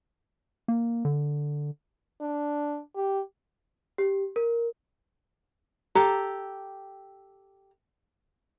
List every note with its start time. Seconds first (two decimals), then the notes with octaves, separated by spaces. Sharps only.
0.68 A#3
1.05 D3
2.21 D4
2.95 G4
3.98 G4
4.36 A#4
5.95 G4 A4 A#5